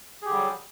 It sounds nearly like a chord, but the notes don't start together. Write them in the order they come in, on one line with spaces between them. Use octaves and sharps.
G#4 G4 D3 G3 F#3